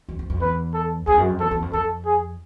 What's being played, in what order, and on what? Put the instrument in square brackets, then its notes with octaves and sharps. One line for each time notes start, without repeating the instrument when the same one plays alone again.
[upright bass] E2
F2
F2
[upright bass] E2 [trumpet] B4
[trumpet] A4
[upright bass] E2 [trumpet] G#4
[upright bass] F#2
F2
[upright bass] E2 [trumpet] A4
[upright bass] E2
F2
[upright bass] F2 [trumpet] A4
[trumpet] G#4